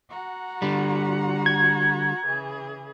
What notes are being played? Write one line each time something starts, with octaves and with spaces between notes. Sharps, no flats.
F#4 F#5 A#5
D3 G3
G#6
C#3 E3 G#4